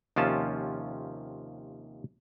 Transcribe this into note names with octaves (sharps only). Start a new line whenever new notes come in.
D#2 C3 F3 C#4 F4 A5